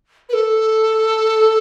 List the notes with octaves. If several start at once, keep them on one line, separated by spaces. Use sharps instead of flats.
B4
A4